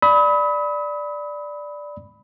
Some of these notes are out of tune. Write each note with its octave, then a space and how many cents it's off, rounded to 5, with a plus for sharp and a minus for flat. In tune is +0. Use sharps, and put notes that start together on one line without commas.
D5 +0 B5 +5 D#6 +45